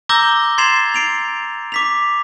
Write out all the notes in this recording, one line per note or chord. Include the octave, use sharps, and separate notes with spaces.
A#5 D6 E6 G6 A#6 G7
C6 G#6 A6 C7 E7 F7
C7 D7 F7
D6 B6 F7